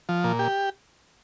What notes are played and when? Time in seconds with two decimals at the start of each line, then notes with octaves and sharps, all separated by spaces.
0.09 F3
0.24 A#2
0.39 G4